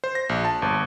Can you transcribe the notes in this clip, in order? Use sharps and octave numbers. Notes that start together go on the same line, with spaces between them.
C5
A#6
A#1
A5
G1